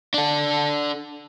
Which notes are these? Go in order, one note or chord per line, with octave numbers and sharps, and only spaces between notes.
D4 A4